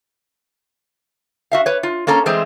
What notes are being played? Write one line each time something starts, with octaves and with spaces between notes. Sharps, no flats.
F#4 E5 F5
B4 C#5
F4
A#3 C#4 A4 A#5
E3 G#3 A3 C4 C5